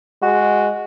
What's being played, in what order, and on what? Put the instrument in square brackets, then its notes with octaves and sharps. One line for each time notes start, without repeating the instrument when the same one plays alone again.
[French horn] G#3 [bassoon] F#4